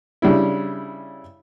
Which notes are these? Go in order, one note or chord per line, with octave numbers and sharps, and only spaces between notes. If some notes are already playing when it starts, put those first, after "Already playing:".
C#3 G3 D4 E4